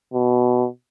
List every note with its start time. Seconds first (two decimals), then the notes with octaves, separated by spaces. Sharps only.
0.14 B2